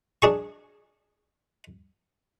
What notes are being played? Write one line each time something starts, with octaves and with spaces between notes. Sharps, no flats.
D4 G#4 C#6